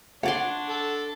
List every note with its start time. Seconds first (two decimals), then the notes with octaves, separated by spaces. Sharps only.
0.23 D4 C#5 D5 F#5 C6
0.69 A4